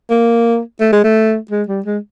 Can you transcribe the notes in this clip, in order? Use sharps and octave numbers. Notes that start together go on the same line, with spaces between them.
A#3
A3
G#3
A3
G#3
G3
G#3